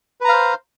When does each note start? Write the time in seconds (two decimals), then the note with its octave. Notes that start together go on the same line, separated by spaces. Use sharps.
0.21 B4
0.25 A#5
0.29 F5
0.33 C5